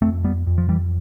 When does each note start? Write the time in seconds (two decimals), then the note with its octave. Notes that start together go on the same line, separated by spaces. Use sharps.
0.02 F2 A3 C4
0.24 G3 B3
0.47 F2
0.58 F3
0.69 E3 G3